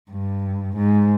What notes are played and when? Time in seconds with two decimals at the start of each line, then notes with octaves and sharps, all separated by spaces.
0.11 G2
0.77 G#2